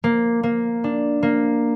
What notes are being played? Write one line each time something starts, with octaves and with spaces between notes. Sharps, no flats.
A#3
A#3
D4
A#3